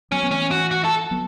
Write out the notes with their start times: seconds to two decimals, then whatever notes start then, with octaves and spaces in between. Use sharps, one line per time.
0.11 F#3 B3 C#4
0.23 B3
0.31 E3 A3 C#4
0.51 F#4
0.71 F#4
0.85 A4
1.11 F#3 B3